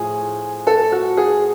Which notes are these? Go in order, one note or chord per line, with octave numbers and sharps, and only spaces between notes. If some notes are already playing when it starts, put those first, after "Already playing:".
Already playing: A2 F3 G#4
A4
F#4
G#4